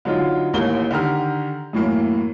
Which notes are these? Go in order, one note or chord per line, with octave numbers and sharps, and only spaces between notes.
D3 F#3 D#4 F4
A1 D#2 E3 A#4 G7
D3 D#3 G4 A#5 F6
F#2 A2 E3 A#3